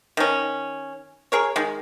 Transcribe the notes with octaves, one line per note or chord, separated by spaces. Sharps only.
D#3 C#4
G#4 A#4 C#5
D#3 G#3